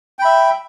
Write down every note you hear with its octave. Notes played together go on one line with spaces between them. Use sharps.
E5 G5 B5